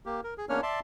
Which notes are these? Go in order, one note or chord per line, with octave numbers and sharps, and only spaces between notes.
A#3 G4
A#4
G#4
E2 A#3 C#4 D4 C#5 F6
D5 E5 A5 C6